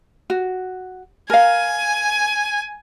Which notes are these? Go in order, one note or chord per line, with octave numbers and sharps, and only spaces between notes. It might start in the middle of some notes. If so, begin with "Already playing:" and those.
F#4
A#4 F5 G#5